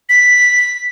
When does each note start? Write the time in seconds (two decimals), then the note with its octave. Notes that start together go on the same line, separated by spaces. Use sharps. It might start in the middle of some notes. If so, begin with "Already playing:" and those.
0.09 B6